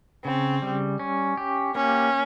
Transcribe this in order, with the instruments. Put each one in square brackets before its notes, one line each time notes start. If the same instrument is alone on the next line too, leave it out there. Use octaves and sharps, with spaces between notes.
[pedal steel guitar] C#3 [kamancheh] C4
[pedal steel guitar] G3
C#4
G4
[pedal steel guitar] A#3 [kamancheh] C#4